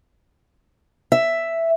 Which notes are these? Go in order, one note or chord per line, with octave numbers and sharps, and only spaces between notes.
E5